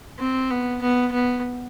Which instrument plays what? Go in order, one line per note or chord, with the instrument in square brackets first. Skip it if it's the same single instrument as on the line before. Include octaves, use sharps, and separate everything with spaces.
[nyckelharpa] C4
B3
B3
B3